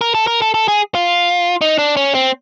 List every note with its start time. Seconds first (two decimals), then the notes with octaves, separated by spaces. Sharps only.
0.01 A#4
0.15 A4
0.27 A#4
0.42 A4
0.54 A4
0.68 G#4
0.95 F4
1.61 D#4
1.78 D4
1.97 C#4
2.15 C4